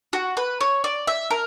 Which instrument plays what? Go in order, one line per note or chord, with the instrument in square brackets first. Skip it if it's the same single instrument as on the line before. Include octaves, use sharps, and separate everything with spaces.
[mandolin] F#4
B4
C#5
D5
E5
A#4